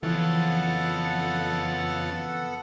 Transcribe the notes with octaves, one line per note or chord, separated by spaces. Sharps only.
F2 C#3 E3 B3 F4 A4 F#5 A5